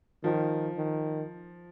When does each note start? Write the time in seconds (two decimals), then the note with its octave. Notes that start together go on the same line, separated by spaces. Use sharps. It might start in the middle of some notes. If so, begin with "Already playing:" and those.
0.24 D#3 F3
0.77 D#3